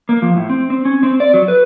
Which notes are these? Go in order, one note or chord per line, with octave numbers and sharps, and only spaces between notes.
A#3
F3
A2
C4
C4
C#4
C4
D5
F#3
B4